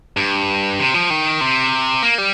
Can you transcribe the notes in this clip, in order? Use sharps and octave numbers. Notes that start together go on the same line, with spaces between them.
G2
C3
F3
D#3
C3
A#3
G3